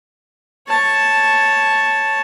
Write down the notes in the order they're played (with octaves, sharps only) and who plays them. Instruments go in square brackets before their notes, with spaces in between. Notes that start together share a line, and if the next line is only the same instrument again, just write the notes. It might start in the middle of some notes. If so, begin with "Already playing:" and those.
[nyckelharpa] C#5 A5